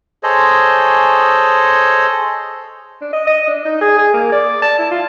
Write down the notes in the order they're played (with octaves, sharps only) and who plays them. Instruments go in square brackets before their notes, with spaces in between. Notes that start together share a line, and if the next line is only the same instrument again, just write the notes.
[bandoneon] G#4 A4 C5 C#5 D#5
[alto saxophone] D4
D#5
D#5
D4
D#4
G#4
G#4
A#3
D5
A5
E4
F4